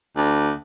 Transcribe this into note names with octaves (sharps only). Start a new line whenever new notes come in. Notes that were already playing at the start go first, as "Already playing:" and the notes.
D2